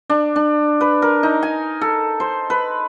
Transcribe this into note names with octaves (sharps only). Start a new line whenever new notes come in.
D4
D4
B4
A#4
D#4
G#5
A4
C5
B4